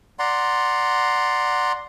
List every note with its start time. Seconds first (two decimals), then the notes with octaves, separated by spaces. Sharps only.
0.19 D5 F#5 A#5 C6